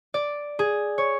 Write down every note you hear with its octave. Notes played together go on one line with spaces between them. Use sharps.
D5
G#4
C#5